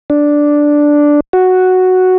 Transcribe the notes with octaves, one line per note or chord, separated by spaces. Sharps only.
D4
F#4